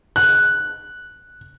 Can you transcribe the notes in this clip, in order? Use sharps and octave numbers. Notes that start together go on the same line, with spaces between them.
F#6